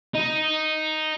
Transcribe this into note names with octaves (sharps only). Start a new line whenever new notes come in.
D#4